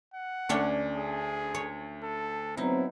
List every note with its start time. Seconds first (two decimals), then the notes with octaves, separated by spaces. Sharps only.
0.14 F#5
0.49 D2 C#4 D4 C#5
0.97 G#4
1.55 C#5
2.03 A4
2.57 F#3 B3 C4 D#4 E4